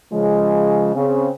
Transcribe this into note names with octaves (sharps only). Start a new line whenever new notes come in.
C#3 F3 G#3
C#3 C4